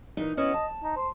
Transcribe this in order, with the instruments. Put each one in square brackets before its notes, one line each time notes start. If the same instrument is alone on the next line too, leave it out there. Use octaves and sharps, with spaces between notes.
[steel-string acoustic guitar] A#2 E3 D#4
[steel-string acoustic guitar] B3 C#4 E4 [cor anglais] D#5
[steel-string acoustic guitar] A5
[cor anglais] D#4
C5